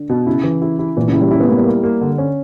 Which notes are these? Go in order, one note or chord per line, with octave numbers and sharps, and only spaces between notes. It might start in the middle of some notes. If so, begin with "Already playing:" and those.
Already playing: D3
B2
C#3 E4
E3
E4
E4
A#2 E3
C#3
E4
G3
C#4 E4
B3
A#3 E4
G3
A#3
A#3
D3
C#4